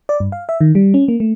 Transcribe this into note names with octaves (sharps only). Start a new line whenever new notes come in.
D5
G2
F5
E5
D#3
G3
C#4
A#3
A3